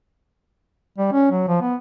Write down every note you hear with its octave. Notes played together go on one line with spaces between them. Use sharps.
G3
C#4
F#3
F3
B3